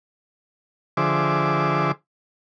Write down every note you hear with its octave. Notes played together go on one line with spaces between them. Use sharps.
D3 F3 G#4 C5 E5 D6